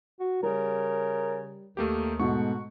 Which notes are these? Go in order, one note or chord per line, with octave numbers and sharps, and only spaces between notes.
F#4
C#3 G3 A#4
D#2 D#3 A3 A#3 G4
G#2 B2 A3 F#4 C#6